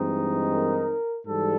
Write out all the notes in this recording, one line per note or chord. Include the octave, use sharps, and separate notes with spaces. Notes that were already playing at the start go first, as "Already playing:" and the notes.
Already playing: G2 E3 G#3 C4 D#4
A#4
G#2 E3 G3 A4